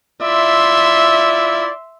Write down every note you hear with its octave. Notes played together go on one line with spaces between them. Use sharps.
E4 F4 D5 E5 C6